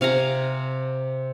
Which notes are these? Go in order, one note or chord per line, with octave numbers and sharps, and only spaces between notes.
C3 F5 G#5 A#5